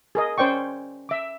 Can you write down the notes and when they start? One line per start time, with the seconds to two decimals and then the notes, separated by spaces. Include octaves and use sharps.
0.15 G#4 A#4 D#5
0.38 C#4 C5 D5 G5 C#6
1.09 E5 D6